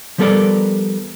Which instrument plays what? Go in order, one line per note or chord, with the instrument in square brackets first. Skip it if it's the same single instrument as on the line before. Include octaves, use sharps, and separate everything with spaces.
[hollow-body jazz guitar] F3 G3 B3 A4 A#4 D5